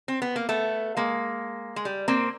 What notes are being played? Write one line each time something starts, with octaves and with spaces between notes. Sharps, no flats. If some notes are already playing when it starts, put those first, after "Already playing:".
C4
B3
A#3
A3 B3
G#3 A#3
G#3
G3
A#3 C4